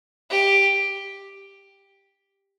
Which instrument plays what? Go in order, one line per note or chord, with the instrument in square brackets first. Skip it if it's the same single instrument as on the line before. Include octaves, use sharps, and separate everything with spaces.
[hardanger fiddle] G4